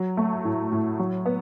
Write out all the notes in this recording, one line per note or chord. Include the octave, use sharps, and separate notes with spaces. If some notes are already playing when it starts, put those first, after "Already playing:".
Already playing: F#3
A3
A2
A2
F#3
B3